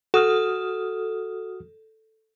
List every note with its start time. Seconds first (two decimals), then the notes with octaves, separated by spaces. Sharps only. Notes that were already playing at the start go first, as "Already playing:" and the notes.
0.14 F#4 A4 D#6 F6